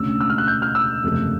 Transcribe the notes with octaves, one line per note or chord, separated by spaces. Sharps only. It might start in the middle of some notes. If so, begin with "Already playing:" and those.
Already playing: E1 D2 C#3 E6
E6
F6
F#6
G6
F6
E6
F#1 E2 C3 F3 A3